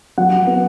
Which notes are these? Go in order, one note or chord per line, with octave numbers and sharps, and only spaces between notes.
F#3 F#5
B3